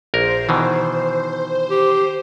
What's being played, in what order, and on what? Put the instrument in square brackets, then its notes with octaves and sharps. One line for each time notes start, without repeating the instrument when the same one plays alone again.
[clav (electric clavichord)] A#1 A#4 [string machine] C5
[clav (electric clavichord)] B2 D#3 E3
[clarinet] G4